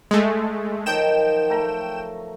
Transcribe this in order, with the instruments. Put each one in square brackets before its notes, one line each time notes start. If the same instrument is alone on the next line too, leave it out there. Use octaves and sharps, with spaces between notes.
[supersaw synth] G#3 A3
[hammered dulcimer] D#3 F3 F#3 [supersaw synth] G5 E7
[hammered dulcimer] A3 A#5